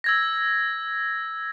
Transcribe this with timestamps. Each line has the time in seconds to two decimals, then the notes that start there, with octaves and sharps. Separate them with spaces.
0.04 E6 G#6 A#6